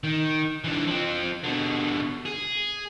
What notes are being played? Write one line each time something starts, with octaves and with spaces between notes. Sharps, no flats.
D#3
E3 D4
F3 C4
B2 D3
G#4